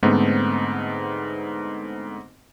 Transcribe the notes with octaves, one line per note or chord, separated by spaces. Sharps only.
G#2 D3 A3 B3 C4 D#4